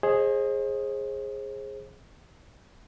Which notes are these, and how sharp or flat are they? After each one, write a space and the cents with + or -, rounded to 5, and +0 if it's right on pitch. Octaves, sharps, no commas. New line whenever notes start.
G#4 +0 C5 +35 D#5 +0